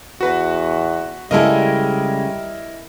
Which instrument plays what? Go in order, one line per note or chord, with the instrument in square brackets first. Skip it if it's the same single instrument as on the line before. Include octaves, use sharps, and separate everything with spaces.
[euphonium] E2 [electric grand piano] F#4 B4
[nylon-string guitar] C#3 G#3 A4 [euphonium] G3 [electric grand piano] E4 A#4 D#5